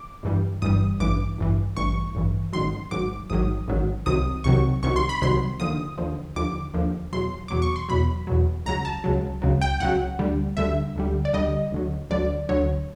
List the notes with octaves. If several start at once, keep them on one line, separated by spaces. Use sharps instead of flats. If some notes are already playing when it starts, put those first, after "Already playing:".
Already playing: D6
G1 G2 E3 G3
G1 G2 E3 G3 D#6
A1 G2 E3 D6
A1 G2 E3
A1 G2 E3 C#6
A1 G2 E3
A1 G#2 D#3 F#3 C6
A1 G#2 D#3 F#3 D6
A1 G#2 D#3 F#3 D#6
A1 G#2 D#3 F#3
C2 C3 D#3 F#3 D#6
C2 C3 D#3 F#3 C#6
C2 C3 D#3 F#3 C#6
C6
B5
C2 C3 D#3 F#3 C6
D#2 D3 F3 D#6
D#2 D3 F3
D#2 D3 F3 D6
D#2 D3 F3
E2 B2 F#3 C6
E2 B2 F#3 D6
C#6
C6
E2 B2 F#3 B5
E2 B2 F#3
C#2 C#3 F#3 A#5
A5
C#2 C#3 F#3
C#2 C#3 F#3
G5
C#2 C#3 F#3 F#5
D2 D3 G3
D2 D3 G3 E5
D2 D3 G3
D5
D2 D3 G3 D#5
D2 D3 F#3
D2 D3 F#3 D5
D2 D3 F#3 C#5